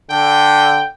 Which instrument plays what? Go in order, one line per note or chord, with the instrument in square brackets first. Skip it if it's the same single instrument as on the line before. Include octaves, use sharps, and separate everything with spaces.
[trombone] D3 [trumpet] G5